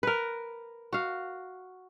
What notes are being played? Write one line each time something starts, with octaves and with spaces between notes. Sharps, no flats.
A#4 B4
F#4 F5